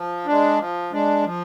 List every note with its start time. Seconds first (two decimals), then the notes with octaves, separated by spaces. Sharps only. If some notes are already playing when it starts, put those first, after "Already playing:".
Already playing: F3
0.26 G#3 D4
0.59 F3
0.92 G#3 D4
1.24 F3